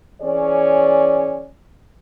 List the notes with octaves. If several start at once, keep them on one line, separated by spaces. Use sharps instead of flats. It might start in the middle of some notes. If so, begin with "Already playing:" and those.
E3 C#4 G#4 C#5 D5